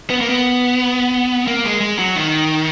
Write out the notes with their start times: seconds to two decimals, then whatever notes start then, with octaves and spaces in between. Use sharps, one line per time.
0.10 B3
0.21 A#3
0.30 B3
1.47 A#3
1.64 G#3
1.81 G#3
1.99 F#3
2.15 D#3